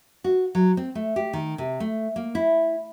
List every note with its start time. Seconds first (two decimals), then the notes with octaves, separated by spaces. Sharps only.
0.24 F#4
0.55 F#3
0.77 C4
0.95 A3
1.16 G4
1.33 D#3
1.58 C3
1.80 A3
2.16 A#3
2.35 E4